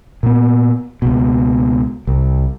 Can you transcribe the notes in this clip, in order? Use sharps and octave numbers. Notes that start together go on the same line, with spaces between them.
A#2 B3
C#2 B2
C2